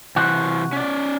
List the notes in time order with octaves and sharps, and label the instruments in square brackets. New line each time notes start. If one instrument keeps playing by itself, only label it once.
[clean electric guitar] C3 F#4 [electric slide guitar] E3 C5
[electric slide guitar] C#4 D5